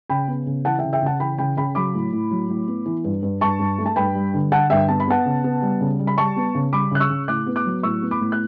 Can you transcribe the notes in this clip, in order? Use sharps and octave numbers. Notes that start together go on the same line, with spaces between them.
C#3 G5 B5
B3
C#3
E3 F#5 A5
C#3 E5 G5
E5 G5
C#3 F#5 A5
E3 G5 B5
C#3 G5 B5
C#3 G5 B5
F#3 B5 D6
A2
A2
F#3
A2
B3
E3
G2
G2
G2 A5 C#6
G2
A3
A5
G2 G5 B5
G3
D3
D3 F#5 A5
G2 E5 G5
B3 A5
B5
B3 F#5 A5
C#3
B3
G3
C#3
G3
B5
G3 A5 C#6
B3
C#3
G3 B5 D6
C#3 F#6
C#6 E6
C#3
A2 D6 F#6
B3
D6 F#6
F#3
A2 C#6 E6
B3
B5 D6
A2
F#6